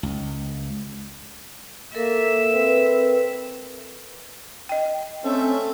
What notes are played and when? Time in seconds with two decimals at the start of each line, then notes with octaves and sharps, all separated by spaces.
0.03 C#2
1.95 A#3 A4 A#4 E5
2.54 C4 B4
4.69 D#5 G5
5.25 C4 C#4 A4 E5